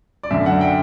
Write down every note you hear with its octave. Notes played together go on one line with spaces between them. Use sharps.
D5
F#2 D3 E5
F#5
G5